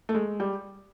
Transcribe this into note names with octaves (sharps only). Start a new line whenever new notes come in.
A3
G#3
G3